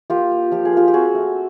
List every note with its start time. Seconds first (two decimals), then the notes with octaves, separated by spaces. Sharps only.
0.10 A#3 F4 G4
0.32 A#3
0.52 F3 G4
0.65 G#4
0.73 A#3 F4 G4
0.88 G4
0.94 C4 F#4 G#4
1.15 A3